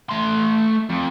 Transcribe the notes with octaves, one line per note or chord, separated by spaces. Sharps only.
A3 C6
F2